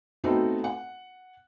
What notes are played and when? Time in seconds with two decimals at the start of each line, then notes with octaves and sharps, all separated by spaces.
0.24 A3 B3 C4 D#4 F#4 A4
0.64 F#5